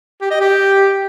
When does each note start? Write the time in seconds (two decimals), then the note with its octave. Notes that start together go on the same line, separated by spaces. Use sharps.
0.21 G4
0.31 D#5
0.40 G4